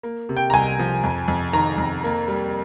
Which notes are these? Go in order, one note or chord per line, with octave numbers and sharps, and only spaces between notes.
A#3
C3
G5
A#5
C2 G#5
F3
F2
F2
D#3 A#5
F2
A#3
G3